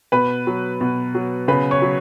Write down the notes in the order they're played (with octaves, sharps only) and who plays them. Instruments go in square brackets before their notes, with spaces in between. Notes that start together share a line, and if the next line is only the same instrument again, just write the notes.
[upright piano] B2 B4 B5
F#3
B2
F#3
C#3 B4 B5
C#5 C#6
F#3